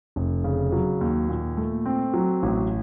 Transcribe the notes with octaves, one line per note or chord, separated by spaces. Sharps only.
F1
C#3
F#3
D#2
A#2
A3
C4
F#3
A1